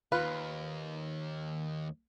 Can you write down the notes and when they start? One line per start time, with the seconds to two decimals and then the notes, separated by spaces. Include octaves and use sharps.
0.12 D#2 F4 B4